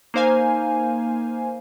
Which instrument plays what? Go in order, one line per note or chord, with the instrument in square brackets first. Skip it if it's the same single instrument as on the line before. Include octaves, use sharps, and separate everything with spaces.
[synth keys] A#3 D#4 C5 F5 G#5